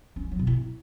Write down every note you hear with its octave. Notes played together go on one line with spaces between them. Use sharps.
C#4
G3
F#3
B2
E4